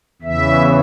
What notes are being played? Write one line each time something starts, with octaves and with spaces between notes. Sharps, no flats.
E2 C#3 E3 E5